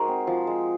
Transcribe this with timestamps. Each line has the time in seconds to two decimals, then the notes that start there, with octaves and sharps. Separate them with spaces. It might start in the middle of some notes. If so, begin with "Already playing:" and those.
Already playing: G#3 D#4 F#4 G#4 A#4 C5
0.08 C4
0.27 F3
0.47 G#3